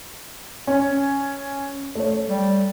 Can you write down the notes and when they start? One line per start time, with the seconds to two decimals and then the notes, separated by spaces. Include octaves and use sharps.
0.67 C#4
1.95 A3 C#5
2.28 G3